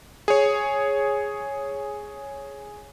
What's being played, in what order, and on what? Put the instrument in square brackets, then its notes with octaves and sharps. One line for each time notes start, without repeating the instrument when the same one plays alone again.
[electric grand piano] G#4 C#5